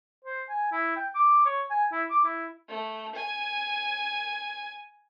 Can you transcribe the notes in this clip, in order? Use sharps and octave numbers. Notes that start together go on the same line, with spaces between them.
C5
G#5
E4
G5
D6
C#5
G#5
E4
D6
E4
A3
G#5